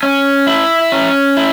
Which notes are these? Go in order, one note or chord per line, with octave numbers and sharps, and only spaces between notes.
C#4
E4
C#4
E4